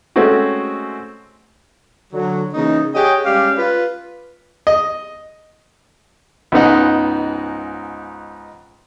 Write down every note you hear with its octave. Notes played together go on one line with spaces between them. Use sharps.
G#3 A3 C4 C#4 F#4
D3 F#3
C#3 E3 A#3 D#4
G4 G#4 C#5 D#5 F#5 G5
G3 G#3 C#4 G4 D5 F5
F4 B4
D#5
C#2 G#2 B3 D#4 F#5